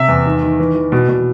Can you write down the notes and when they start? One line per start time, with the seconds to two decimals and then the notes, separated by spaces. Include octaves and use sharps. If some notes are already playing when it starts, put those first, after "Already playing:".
Already playing: C3 E5
0.08 E2
0.26 D#3
0.43 D#3
0.60 E3
0.75 E3
0.92 B2
1.09 B2